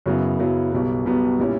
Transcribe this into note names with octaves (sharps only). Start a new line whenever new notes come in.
F#2 C#3 F#3 B3 E4
F#2 C#3 F#3 B3 E4
B1 B2 G3 B3
B1 B2 G3 B3
A#2 G3 C#4 E4